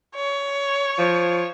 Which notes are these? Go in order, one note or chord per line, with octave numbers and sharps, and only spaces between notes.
C#5
F3